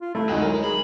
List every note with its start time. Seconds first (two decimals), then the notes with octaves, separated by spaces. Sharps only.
0.01 F4
0.15 A3 E4
0.29 D2 G#3 D#4
0.42 F#3 A#4
0.64 G#4 B5